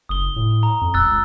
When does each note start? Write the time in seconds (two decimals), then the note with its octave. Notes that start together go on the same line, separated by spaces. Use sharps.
0.09 F#1 D#6 G7
0.36 A2
0.63 A#5
0.81 F2
0.94 D#1 E6 F#6 A6
1.08 C#2